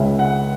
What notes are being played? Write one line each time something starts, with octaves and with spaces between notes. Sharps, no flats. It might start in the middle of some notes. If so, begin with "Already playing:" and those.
Already playing: C#2 C#3 G#3 C#4 E5
F#5